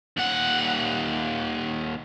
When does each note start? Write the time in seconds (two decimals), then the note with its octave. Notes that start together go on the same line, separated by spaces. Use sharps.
0.17 D#2 F#5